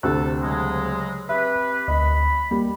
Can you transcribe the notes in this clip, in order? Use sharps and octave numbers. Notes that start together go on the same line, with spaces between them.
D2 C3 A4 E6 F#6
C#3 F#3 G#3
C4 G4 B4 E5
D2 D#5 B5
G3 A#3